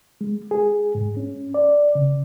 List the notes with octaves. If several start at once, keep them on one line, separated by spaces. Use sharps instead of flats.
G#3
G#4
G#2
C#4
D5
C#3